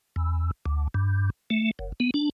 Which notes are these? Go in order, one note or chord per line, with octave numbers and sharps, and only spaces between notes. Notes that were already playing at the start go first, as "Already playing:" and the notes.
E2
D2
G2
A3
F#1
B3
D4